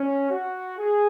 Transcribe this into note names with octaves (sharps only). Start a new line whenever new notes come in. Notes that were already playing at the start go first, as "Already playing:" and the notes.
Already playing: C#4
F#4
G#4